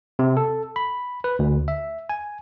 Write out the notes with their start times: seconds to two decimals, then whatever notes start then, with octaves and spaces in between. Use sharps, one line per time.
0.19 C3
0.37 A4
0.76 B5
1.24 B4
1.39 D2
1.68 E5
2.09 G#5